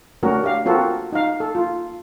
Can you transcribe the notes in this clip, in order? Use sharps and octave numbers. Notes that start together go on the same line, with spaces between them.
A3 C#4 D4 F#4 A#4
G4 F5
C4 F4 F#4 A4 A#4
D#4 F5
A4
F4